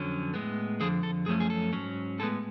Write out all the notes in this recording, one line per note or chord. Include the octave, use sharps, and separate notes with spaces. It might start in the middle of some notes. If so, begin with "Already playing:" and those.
Already playing: F2 D3 F#3 C#4
A2 G#3 B3
F2 D3 F3 G#4
A4
F#2 F3 A3 C#4 G#4
G#4
A4
G#2 F#3 C#4
A2 G#3 B3 A4